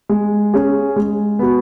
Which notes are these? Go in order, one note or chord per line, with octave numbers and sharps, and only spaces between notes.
G#3
C#4 G#4
G#3
B3 F#4